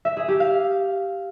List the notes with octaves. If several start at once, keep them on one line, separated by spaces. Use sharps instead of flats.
E5
G#4
G4
F5